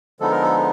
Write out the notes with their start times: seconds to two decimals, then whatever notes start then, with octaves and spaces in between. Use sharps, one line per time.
0.20 D3 F3 G#3 B3 D#4 A4
0.31 A#4
0.42 A4